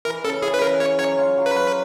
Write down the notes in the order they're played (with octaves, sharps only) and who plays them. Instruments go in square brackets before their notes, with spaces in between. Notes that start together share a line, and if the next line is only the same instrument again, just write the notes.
[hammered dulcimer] E3 [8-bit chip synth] A#4
[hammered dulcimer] C#3 [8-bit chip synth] A4
[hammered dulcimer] E3 [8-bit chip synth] G#4
[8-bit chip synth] B4
[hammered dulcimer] C#3 [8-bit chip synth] A#4
[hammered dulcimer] C#3 [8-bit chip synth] C#5
[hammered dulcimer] F#3 [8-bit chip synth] C#5
[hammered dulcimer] F4
F#3
[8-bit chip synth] B4
[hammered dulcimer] F#3